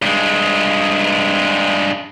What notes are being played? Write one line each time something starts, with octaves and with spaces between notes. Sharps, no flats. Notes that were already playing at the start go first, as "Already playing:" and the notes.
G2 G#3